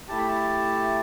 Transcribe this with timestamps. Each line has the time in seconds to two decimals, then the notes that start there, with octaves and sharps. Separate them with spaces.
0.08 A3 E4 G4 A5
0.18 B5
0.28 A5